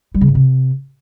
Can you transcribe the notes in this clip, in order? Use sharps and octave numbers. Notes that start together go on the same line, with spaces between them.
G3
C#3
G#2
C3